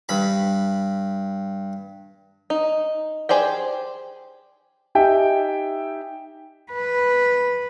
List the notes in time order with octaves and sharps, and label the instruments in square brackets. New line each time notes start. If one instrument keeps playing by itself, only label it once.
[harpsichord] G2 B5
[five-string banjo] D#4
G4 G#4 C5 D5 G5
[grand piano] D#4 G4 E5 G5 G#5
[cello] B4